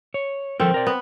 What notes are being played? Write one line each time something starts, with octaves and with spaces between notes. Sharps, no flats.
C#5
F3 C4 A4 A#4
A#4 D5
B3